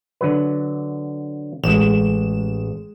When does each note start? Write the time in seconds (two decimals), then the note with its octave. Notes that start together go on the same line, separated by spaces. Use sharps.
0.21 D3 F#3 B4
1.64 A1 G#3 E7